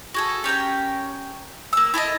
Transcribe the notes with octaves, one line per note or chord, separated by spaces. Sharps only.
F#4 G#4 A4
C#4 G4 A#4 G5
A#3 E6
E4 A4 D5 D#5